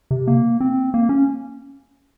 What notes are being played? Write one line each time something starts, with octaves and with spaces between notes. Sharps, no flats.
C3
A#3
C4
A#3
C#4